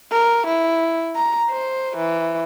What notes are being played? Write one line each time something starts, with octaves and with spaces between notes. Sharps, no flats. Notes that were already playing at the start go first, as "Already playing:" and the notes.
A#4
E4
A#5
C5
E3